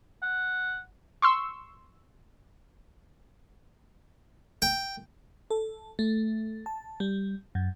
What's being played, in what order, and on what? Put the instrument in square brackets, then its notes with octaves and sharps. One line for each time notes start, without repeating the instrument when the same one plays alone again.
[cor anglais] F#5
[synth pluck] C6 C#6 E6
[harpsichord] G5
[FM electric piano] A4
A3
A5
G3
F#2